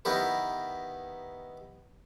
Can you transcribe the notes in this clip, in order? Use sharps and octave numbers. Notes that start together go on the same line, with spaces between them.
D#3 B3 E4 G4 A#4 B4